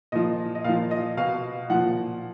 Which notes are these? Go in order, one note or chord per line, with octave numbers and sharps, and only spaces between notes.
A#2 F3 D#5
D#5
A#2 F3 F5
D#5
B2 F5
A#2 F3 F#5